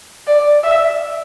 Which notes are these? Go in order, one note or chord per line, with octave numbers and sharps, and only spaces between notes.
D5
E5